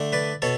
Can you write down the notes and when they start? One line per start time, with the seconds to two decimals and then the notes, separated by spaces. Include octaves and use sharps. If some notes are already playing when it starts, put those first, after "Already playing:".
Already playing: D3 A3 D4
0.13 B4 D5
0.42 B2 A4 C#5